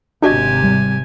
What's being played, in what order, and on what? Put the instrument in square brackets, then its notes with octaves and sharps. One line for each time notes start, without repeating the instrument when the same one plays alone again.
[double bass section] G#1 C3 [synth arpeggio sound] D4 F#4 D#5 [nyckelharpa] G4 G#5
[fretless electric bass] G3